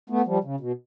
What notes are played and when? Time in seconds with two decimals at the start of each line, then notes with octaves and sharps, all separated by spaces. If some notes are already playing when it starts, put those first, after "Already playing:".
0.10 A3 B3
0.26 F3 G3
0.44 C#3
0.60 B2